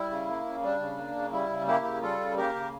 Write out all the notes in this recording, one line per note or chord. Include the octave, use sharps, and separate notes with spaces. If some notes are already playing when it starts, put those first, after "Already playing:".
Already playing: G3 E4
C#3
A#3
C#3
G3 D4
C#3
A#3
C#3
G3 E4
C#3
A#3 E4 G4
C#3
G3 F4 A4
C#3
A#3 G4 A#4
C#3